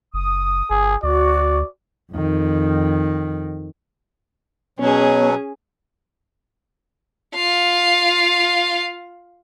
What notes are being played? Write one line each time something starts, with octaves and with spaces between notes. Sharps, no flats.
F#1 D#6
G1 G#4
D2 F#4 D5
F2 D#3
B2 F#3 B3 C#4 G#4 C#5
F4 F5